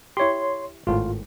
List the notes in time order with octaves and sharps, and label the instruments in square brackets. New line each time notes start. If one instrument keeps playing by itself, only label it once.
[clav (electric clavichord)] E4 G4 [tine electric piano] C#5 C6
[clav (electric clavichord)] G#1 A2 [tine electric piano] F4